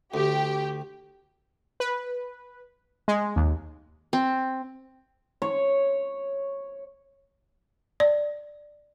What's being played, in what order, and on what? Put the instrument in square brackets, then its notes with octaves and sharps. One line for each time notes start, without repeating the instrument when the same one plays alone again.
[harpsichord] D2 [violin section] G4
[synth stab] B4
G#3
D#2
[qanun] C4
[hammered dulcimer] C#5
[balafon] D5